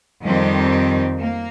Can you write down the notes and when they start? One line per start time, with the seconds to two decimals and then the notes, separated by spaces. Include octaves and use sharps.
0.23 F2 D#3 G3 C4
1.20 A#3